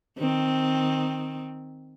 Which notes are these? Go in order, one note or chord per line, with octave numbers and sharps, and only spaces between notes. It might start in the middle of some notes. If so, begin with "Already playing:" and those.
D#3 C4